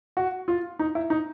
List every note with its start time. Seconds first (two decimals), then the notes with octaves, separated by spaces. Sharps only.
0.17 F#4
0.48 F4
0.79 D#4
0.95 E4
1.10 D#4